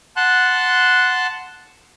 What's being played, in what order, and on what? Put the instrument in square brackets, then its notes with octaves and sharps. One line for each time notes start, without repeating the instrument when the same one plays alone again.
[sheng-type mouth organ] F#5 A5 C6 F#6